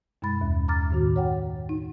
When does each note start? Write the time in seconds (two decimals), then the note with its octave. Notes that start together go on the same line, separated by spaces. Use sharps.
0.22 F#2 B2 G#3 B5 A6
0.41 D#2
0.68 D#2 A#5 D6 F6 A6
0.91 A2 D#3 F#4
1.16 C#5 F#5 G5
1.69 D#4